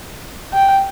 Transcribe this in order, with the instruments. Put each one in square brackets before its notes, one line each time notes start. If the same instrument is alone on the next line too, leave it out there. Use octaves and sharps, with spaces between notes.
[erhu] G5